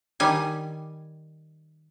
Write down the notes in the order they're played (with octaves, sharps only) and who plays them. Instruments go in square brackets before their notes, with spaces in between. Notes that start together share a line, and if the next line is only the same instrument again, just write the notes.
[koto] D#3 G3 G#5